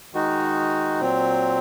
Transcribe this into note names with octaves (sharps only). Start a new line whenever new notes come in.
D#3 G#3 D#4 F#4
A#2 F#3 C4